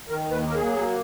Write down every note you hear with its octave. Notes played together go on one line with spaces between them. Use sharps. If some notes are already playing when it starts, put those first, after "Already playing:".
D#3 A#4
D#2
B4
A#3 A#4
G#4
F#3
A#3